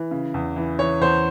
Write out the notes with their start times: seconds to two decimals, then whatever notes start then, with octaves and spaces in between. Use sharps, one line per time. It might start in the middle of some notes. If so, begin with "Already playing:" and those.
Already playing: E3
0.11 C#3
0.34 E2
0.56 E3
0.79 E3 C#5
1.01 E2 C5